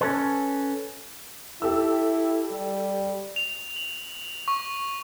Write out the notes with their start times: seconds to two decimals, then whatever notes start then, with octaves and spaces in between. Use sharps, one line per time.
0.01 C#4 A4 B4
1.62 E4 G4 A4 E6
2.51 G3
3.36 F7
3.76 F#7
4.48 C#6